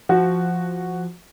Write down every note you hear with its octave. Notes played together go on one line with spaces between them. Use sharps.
F3 F#4